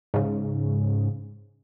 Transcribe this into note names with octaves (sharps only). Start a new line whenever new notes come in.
G#2 C#3